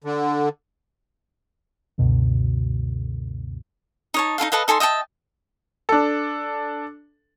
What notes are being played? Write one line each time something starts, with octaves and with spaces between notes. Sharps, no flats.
D3
C#2 F#2 B2 D3
D#4 C#5 A5
D#4 F4 A4 F5
A4 B4 D#5 F5
D#4 A4 G#5 C6
D#5 E5 G5 A5
D4 A4